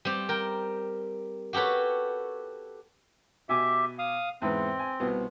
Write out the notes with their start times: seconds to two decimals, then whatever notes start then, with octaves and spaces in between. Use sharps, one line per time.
0.05 G3 C4 G4
0.29 A#4 G5
1.53 F#4 G4 A4 B4 C#5
3.49 B2 G4 E5 G#5 D6
3.99 F5 D#6
4.42 E2 G#2 C4 B4
4.79 G#5
5.00 C2 B2 B3